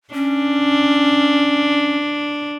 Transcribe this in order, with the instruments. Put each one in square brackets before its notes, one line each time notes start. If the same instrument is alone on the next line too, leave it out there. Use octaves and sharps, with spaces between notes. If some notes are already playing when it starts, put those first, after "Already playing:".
[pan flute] C#4 [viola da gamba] D4